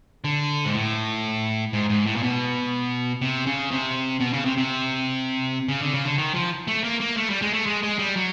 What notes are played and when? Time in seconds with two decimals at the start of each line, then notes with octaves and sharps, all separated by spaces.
0.24 D3
0.65 G#2
0.74 A2
1.73 G#2
1.90 G#2
2.06 A2
2.16 A#2
2.23 B2
3.21 C3
3.46 C#3
3.71 C3
4.20 B2
4.33 C#3
4.45 C3
4.57 C3
5.68 C#3
5.81 D3
5.93 C#3
6.05 D3
6.18 D#3
6.34 F3
6.68 A3
6.84 A#3
7.01 A#3
7.17 A3
7.30 G3
7.42 G#3
7.53 A3
7.66 G#3
7.83 G#3
7.99 G3
8.16 F#3